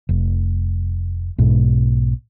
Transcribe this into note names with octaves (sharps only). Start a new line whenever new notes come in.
F1
B1 G#2 B2